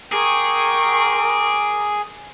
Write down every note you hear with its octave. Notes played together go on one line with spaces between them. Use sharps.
G#4 A#4 G5 C#6 D6